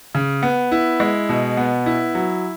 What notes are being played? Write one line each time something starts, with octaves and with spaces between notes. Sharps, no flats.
C#3
B3
E4
G#3
B2
B3
E4
F#3